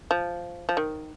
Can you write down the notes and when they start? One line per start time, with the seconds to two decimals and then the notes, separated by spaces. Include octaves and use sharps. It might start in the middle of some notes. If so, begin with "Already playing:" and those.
0.11 F3
0.69 F3
0.77 D#3